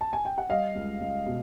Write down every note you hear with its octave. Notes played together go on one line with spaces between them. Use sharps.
A5
G#5
G5
F#5
G3 D#5 F5
C#2
C#2
B2